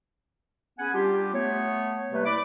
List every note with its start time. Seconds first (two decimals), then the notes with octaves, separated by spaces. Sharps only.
0.79 B3 C#4 G#4 F#5 G#5
0.94 G3 D4 F4 G4
1.33 A3 B3 C#5
2.12 C3 G3 A3 A#3 B4
2.25 E4 D5 B5 D6